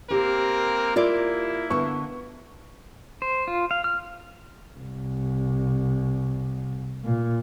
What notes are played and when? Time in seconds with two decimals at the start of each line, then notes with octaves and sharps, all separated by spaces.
0.11 A#3 C4 G4 A#4
0.96 A#3 E4 F4 A#4 D5
1.70 D3 B3 C#6
3.22 C5
3.48 F4
3.71 F5
3.84 F6
4.79 C2
7.04 A#2